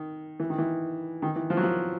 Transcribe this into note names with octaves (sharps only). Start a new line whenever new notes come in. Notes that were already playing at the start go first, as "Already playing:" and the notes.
Already playing: D#3
E3
D#3
E3
D#3
E3
F3
F#3
F3